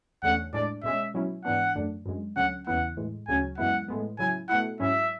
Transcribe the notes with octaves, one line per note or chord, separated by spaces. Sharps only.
E2 D3 A3 C#4 F#5
A2 G#3 D4 D5
B2 G#3 C#4 E5
B2 F#3 C#4 E4
G#2 E3 B3 D4 F#5
F#2 D3 A3 D4
F#2 D3 G#3
D2 D3 F#3 C#4 F#5
E2 C#3 E3 B3 E4 F#5
A2 E3 G#3
D2 C#3 F#3 C#4 G#5
F#2 E3 G#3 B3 E4 F#5
A2 G#3 B3
C#3 F#3 C#4 E4 G#5
B2 A3 E4 F#5
G#2 F#3 C#4 E4 E5